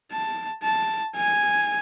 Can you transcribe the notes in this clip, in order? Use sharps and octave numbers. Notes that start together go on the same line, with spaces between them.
A5
A5
G#5